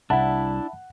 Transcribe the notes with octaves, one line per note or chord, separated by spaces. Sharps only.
C2 D4 E4 E5 F#5 A5 B5